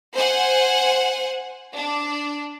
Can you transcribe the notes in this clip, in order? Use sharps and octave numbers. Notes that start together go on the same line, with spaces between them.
C5 F#5 G#5
D4